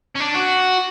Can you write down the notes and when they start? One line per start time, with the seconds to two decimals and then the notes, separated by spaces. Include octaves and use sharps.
0.15 C#4
0.20 D4
0.34 F#4